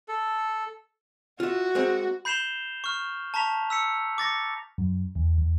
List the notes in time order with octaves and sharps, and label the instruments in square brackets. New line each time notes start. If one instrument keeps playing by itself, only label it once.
[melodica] A4
[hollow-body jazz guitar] F4 E5 [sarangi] F#4
[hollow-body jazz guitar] G#3 A#3 C4
[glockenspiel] B5 G6 C7 E7 F7 G7
C#6 F6
A5 A#5 C#6 B6 F7
E6 B6 C#7
D6 A6 A#6 C#7
[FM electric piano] F#2
E2
E2